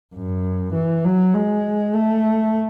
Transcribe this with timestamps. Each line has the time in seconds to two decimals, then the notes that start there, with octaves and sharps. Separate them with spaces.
0.15 F#2
0.74 E3
1.05 F#3
1.34 G#3
1.95 A3